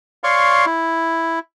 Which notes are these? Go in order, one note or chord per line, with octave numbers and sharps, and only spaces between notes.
C#5 D5 F5 C6 C#6
E4